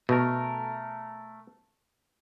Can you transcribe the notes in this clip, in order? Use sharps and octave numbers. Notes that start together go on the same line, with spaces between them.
B2 A3 A#4